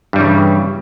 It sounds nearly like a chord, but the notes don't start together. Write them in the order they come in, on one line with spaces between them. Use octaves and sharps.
G2 G3 E3 C#3